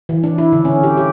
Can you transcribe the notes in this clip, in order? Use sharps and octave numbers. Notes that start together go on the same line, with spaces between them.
E3
D4
E4
D3
C#4
G4
G4